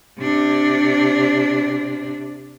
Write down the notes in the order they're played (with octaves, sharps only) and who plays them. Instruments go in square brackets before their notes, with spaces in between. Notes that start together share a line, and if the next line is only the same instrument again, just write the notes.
[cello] C3 D4